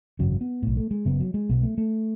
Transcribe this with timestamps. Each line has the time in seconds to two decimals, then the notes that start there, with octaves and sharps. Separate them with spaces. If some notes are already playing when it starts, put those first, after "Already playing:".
0.19 G#1 F#2 C#3 F#3
0.41 B3
0.63 B1 A2
0.77 A3
0.91 G#3
1.05 F#1 F#2 C#3 B3
1.20 F#3
1.34 G#3
1.49 B1 B2 B3
1.63 A3
1.78 A3